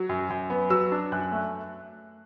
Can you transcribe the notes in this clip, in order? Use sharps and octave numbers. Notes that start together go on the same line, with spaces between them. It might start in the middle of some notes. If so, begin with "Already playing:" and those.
Already playing: F#3
F#2
F#2
B3
F#3 E6
D4
F#2 F#6
A3